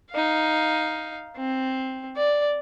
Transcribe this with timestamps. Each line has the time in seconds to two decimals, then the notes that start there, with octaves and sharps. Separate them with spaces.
0.12 D#4 F5
1.37 C4
2.17 D5